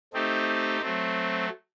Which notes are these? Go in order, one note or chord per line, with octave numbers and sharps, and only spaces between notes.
A3 C4 D#4 G4
F#3 A3 C4